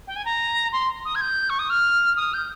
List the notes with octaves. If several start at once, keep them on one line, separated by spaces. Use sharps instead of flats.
G5
G#5
A#5
C6
D#6
G#6
G6
C#6
D#6
F6
D#6
G6